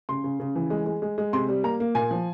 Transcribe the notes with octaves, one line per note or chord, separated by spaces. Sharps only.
C#3 C6
C#3
C#3
E3
G#3
G#3
G#3
G#3
C3 C6
G3
A#3 A#5
A#3
A#2 G#5
F3